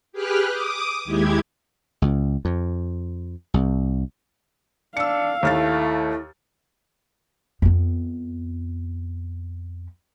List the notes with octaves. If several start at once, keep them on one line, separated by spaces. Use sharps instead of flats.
G4 G#4 B4 G5 F6 F#6
D6 D#6
D#2 G#3 E4 G4 G#6
C#2
F2
C2
D4 F5 E6 C#7
D#2 A3 E4 F6 A6
F2 B3